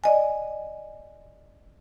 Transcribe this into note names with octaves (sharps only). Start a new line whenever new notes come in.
D5 D#5 G#5